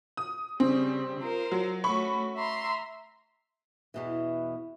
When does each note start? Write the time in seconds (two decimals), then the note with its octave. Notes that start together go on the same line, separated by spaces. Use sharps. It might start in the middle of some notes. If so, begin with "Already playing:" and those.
0.17 D#6
0.60 C#3 G3 C4
1.20 F4 A#4 C5
1.52 F#3
1.84 A3 C#4 F#4 B5 C#6
2.37 E5 A#5 C6
3.94 E2 B2 E3